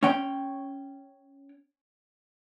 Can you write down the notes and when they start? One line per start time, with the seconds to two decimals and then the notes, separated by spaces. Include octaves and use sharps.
0.03 C#4 C#5 G5